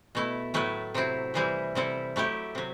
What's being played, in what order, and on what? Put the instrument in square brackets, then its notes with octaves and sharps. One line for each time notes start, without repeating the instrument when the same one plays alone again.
[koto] B2 A3 E4
A2 F#3 A3 E4 B4
C3 F#3 C4 E4
C3 E3 G3 C4 E4
C3 G3 C4 E4 A4
F#3 A3 E4 G4
C3 F#3